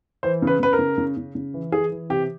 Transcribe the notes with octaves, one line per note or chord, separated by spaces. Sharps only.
E3 C5
C#3
B4
C#3 B4
A#4
C#3
C#3
C#3
C#3
E3
E3 G#4
E3
C3 G4